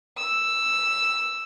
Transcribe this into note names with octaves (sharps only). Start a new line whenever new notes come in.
E6